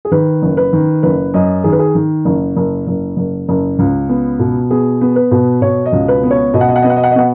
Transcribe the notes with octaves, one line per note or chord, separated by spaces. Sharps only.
G#4
D#3 B4
F#1
B4
D#3
F#1 B4
F#2 D#5
D#3 G#4
B4
G#4
D#3
F#1
F#1
F#1
F#1
F#1
C#2
B3
B2
B3 G#4
B3
B4
B2
B2 C#5
D#5
C#2
B4
B3
C#5
B2 D#5
F#5
D#5
F#5
B3 D#5
F#5
D#5
F#5
D#5
B3 F#5